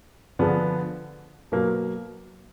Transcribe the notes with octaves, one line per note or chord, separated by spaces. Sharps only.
D3 F3 B3 D4 G#4
B2 F#3 A#3